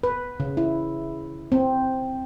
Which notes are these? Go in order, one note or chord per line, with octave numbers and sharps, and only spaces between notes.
B4
C#3
E4
C4